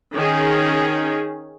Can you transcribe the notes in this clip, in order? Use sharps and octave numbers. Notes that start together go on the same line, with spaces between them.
D#3 C#4 G#4